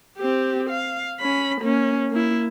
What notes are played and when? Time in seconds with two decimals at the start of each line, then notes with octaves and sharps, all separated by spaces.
0.18 C4 G4
0.69 F5
1.20 C#4 B5
1.61 A#3 C#4
2.12 A#3 E4